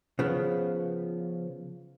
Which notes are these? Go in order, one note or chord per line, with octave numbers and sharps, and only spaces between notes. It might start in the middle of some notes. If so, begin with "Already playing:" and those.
C#3 F3 B3